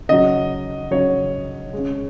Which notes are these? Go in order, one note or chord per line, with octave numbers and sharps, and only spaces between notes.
C#3 F#3 D#5
C#3 F#3 C#5
C#3 G#3